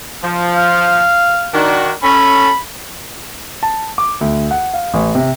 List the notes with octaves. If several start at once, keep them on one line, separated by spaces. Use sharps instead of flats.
F3
F5
D#3 D4 F#4
C#4 A4 B5
A5
D6
D2
F#5
F5
A1
C3